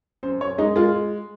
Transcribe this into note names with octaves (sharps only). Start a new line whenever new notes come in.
F#2 C5
F#2 C#5
G#3 D#4
G#3 F4